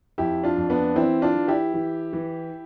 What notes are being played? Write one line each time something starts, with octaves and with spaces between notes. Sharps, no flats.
F2 E4 G4
D4 F4
F2
B3 D4
E3 C4 E4
D4 F4
E3
E4 G4
E3
E3